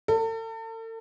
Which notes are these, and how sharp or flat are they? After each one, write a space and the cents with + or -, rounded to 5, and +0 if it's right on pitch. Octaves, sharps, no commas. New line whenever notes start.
A4 +40